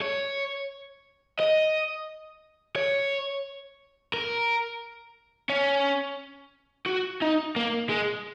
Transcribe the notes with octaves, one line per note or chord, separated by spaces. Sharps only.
C#5
D#5
C#5
A#4
C#4
F#4
D#4
A#3
G#3